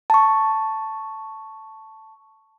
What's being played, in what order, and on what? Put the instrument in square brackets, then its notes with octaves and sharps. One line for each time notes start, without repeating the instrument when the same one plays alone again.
[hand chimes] A5 C#6